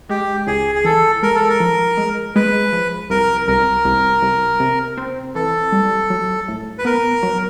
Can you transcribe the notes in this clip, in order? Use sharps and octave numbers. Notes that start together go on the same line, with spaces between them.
G#3 G4
C#2 G#4
G#4
E3 A4
G#3 A#4
A4
A#4
F3
G#3
G#3 B4
F3
C2 A#4
C2 A#4
C2
C2
C3
C4
E3 A4
G3
F#3
A2
B4
B3 A#4
F#3